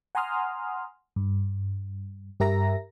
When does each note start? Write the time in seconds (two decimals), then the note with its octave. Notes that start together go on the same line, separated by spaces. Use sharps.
0.15 F#5 G#5 A#5 C6 D#6 F6
1.16 G2
2.40 G2 G4 A#4 E5 A#5 A#6